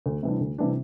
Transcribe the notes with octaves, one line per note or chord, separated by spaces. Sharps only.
D2
C3 E3 G3 D4
D2
C3 E3 G3 D4